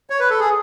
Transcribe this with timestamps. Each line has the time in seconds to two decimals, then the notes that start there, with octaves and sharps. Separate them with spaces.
0.10 C#5
0.20 B4
0.30 A4
0.39 G#4